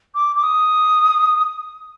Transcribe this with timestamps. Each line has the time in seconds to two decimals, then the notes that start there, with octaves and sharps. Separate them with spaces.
0.14 D6
0.36 D6
0.43 D#6